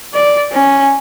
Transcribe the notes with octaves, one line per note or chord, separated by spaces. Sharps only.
D5
C#4